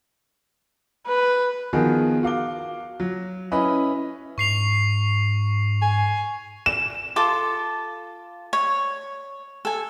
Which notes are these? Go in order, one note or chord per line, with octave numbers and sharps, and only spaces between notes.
B4
D#3 F3 B3 F#4 G#4
F#4 F5 D6 G7
F#3
C#4 E4 B4 D#5 B5
G#2 C#6 C7 F7
G#5
E7
F4 A4 D6
C#5
A4 G#5